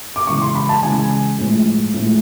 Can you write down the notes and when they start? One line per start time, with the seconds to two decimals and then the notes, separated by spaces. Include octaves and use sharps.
0.16 D6
0.27 C#3 E3 G#3 C#6
0.42 C6
0.55 B5
0.69 A5
0.83 C#3 E3 G#3 G#5
1.39 A2 F3 G#3
1.94 A2 F3 G#3